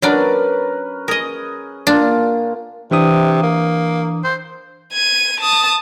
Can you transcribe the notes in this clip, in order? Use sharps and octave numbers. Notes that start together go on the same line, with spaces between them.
F#3 C#4 D4 A#4 B4 D5
G#4 A#4 D#5
A#2 D4 F4
C3 E3 D4 D#6
A#3
C5
G#6 D#7
A5 D#6